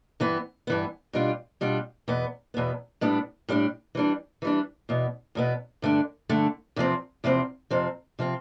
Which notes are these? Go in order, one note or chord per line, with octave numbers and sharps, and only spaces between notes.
G2 E3 B3
G2 E3 B3
B2 G3 D4 F4
B2 G3 D4 F4
E2 B2 B3
E2 B2 B3
A2 G3 B3 D4
A2 G3 B3 D4
E3 G3 D4
E3 G3 D4
E2 B2 B3
E2 B2 B3
G2 D3 A3 D4
G2 D3 A3 D4
E2 C3 F3 C4
E2 C3 F3 C4
F2 C3 F3 C4
C3 F3 C4